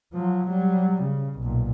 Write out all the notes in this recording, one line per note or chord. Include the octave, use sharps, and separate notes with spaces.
F3 F#3
F#3 G3
C#3
B1 A#2